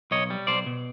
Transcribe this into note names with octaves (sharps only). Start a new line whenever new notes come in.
B1 C#5 D#5
G3
B1 C5 D5
B2